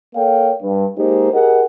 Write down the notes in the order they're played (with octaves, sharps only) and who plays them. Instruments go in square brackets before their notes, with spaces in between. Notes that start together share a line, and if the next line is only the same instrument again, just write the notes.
[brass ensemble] A#3 A4 C#5 F5 G5
G2
G#3 A#3 D#4 G4 C5
G4 G#4 A#4 D#5 F#5